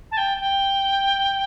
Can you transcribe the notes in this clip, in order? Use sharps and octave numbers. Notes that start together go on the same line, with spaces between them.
A5
G5
G5